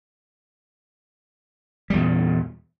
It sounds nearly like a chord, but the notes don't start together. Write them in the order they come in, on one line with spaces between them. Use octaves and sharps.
G3 E2 A#2